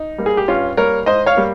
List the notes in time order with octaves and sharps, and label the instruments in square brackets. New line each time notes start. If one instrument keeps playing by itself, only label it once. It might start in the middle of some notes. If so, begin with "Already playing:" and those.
Already playing: [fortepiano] D#4
G3 A#3
G#4
G4
G2 C#4 F4
G3 A#3 A#4 C#5
G#2 C5 D#5
C#5 F5
G3 A#3